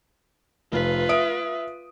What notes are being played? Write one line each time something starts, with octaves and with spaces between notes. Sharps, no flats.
F1 F4 B4
E5 D#6 D7